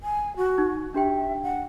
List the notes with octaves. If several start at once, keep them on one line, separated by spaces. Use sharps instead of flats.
G#5
F#4
D#4
D4 G4 E5 G5
F#5